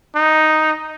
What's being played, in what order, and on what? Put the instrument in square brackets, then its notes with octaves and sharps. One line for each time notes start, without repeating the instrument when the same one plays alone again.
[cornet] D#4